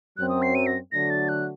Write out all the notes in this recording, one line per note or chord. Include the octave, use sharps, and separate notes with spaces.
F#2 F#3 C4 F#6
D#6
C7
D#7
A#6
D3 F#3 A3 D4 F#4 A#6
A6
F#6